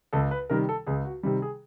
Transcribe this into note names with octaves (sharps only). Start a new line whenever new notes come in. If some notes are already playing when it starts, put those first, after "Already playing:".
C#2 A4
B4
C3 D#3 G3 A#4
A4
C#2 G#4
F#4
C3 D#3 G3
G#4